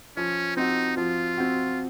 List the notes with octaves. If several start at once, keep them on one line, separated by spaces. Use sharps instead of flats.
F3 C#4
C4 D#4 F#4
F3 F4
C4 F#4